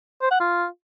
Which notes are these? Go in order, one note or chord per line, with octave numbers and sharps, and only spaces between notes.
C5
F#5
F4